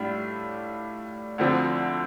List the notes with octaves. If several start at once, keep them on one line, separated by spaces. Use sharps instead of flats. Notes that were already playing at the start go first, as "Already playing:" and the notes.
Already playing: A2 G3 D4 F4
D2 D3 F3 C4